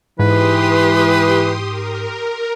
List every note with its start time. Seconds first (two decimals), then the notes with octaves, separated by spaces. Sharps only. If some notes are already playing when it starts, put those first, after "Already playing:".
0.19 G#2 E3 G4 B4 C6 D#6
1.67 A#4